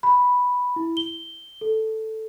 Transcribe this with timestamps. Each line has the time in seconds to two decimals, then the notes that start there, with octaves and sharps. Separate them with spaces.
0.03 B5
0.76 E4
0.97 G7
1.61 A4